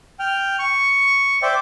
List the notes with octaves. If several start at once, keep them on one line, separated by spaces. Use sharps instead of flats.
G5 F6
C#6
C5 D5 E5 G5 D6